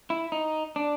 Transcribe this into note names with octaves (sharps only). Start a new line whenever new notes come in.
E4
D#4
D4